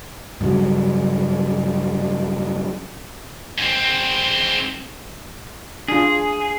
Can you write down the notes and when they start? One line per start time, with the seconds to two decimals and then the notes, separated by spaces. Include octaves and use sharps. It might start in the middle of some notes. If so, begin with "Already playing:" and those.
0.41 G2 C#3 F#3
3.58 G#2 C4
5.88 D4 F4 G#4